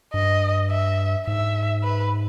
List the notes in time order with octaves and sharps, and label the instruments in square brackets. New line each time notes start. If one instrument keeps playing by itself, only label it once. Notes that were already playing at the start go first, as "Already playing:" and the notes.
[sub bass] G2 [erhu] D#5
[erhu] E5
[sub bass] G#2 [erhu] E5
[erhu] B4